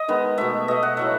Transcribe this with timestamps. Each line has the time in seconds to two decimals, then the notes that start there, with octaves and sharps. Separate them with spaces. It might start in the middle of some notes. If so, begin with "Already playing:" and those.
Already playing: D#5
0.08 D#3 G#3 B3
0.38 B2 A3 E5
0.68 B2 A3 D#5
0.83 F#5
0.97 A2 F#3 A3 E5